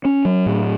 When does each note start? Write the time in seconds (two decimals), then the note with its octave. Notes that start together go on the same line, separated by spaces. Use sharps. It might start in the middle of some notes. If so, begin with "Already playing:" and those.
0.05 C#4
0.25 F#3
0.46 A2